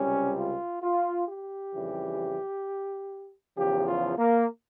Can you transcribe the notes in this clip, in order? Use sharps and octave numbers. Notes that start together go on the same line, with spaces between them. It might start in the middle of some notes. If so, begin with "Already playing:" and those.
Already playing: C#2 C3 G3 C#4
F4
F4
G4
F2 C#3 E3 G3
E2 C#3 F3 G4
F4
A#3